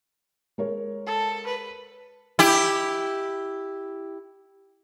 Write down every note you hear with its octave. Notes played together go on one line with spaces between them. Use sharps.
G#3 A#4 C#5
A4
B4
E4 G4